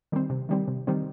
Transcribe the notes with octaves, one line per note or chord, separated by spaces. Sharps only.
D#3 G3 C4
C3
D#3 G3 C4
C3
D#3 G3 C4